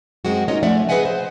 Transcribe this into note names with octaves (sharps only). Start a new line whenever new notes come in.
F#2 F#3 G#3 C4 F#4
C#4 D#4 F4 A#4 C#5 D#5
F3 A3 C#4 D5 E5 F#5
G#4 B4 D#5 E5 F#5 G#5
C5